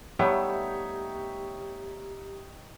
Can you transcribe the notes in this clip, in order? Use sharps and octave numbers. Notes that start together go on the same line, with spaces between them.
G3 A3 B3 D#4 G4 C#5 E5 G5